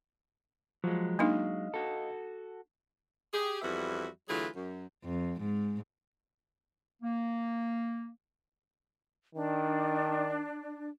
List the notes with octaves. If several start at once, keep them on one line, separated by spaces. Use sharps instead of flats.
F3 F#3 G#3
A#3 D4 D#4 D#5 F5
F#4 A4
G4 G#4
F2 E3 G3 B3 F#4 E5
D3 E3 F#3 A3 F4 G#4
F#2
F2
G#2
A#3
D#3 D4